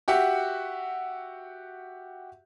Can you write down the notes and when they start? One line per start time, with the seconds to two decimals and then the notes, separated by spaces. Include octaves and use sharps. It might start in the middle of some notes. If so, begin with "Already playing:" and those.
0.08 F#4 G4 E5 F#5